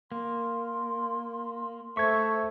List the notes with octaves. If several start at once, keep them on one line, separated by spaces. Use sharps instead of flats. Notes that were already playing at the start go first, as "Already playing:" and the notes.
A#3 C6
A3 C5 E5 C#6 G#6